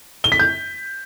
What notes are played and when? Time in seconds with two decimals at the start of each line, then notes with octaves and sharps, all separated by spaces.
0.24 G7
0.32 B6
0.39 G6